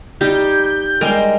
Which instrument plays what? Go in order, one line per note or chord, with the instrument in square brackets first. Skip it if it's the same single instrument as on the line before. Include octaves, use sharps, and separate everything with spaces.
[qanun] G3 D#4 G4 [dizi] G6
[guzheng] G3 G#3 D#4 [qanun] A#4 C6